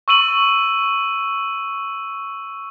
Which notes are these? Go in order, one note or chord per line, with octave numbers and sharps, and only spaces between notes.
C#6 E6 D#7 F#7